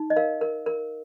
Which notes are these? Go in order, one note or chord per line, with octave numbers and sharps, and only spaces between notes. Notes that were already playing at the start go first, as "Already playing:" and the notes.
Already playing: D#4
D#5
A#4 F5
A#4
A#4